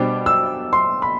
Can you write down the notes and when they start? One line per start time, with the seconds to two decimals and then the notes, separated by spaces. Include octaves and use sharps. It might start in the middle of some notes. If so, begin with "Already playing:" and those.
Already playing: B2 G3 D4 C5 D6
0.26 E6
0.73 C6
1.02 B5